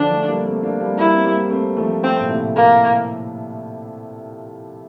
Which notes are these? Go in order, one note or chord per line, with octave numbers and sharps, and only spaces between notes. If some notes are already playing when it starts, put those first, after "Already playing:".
Already playing: D3 F3 D4
F3 A3
G3 A#3
A3 C4
A#3 D4
G3 A#3
G3 A#3 E4
C4
G3 A#3
A3 C4
F3 A3
F3 A3 C4
A#2
A2 C3
A#3